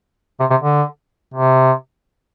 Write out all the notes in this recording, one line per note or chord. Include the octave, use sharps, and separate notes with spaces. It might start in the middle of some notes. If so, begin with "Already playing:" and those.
C3
C3
D3
C3